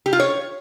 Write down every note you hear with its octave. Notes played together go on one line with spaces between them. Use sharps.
G4
F4
C#5